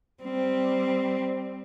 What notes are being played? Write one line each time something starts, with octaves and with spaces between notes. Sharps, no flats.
G3 C4